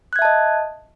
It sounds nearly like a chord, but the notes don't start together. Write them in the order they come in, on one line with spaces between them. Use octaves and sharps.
F#6 G#6 E5 A5 D#5